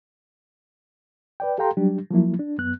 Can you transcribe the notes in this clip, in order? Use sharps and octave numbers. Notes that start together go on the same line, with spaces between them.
B4 D5 G5
G4 A4 F5 G5 A#5 C6
F#3 G3 D4 G4
F3 F#3 A#3 E4
D4
F#2 B3 F#6